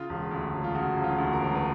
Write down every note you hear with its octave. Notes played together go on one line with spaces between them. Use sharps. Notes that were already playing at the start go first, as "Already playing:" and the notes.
Already playing: C#3 F4
E1
D2
E1
F4
C#3 F#4
E1
F4
D2
A#4
E1
B4